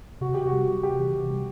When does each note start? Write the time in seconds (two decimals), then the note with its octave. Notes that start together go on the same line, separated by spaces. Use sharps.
0.21 C3 F#4
0.34 C3 G4
0.47 F#4
0.53 G3
0.67 G3
0.83 C3 G4
0.98 E3
1.14 C3
1.29 G3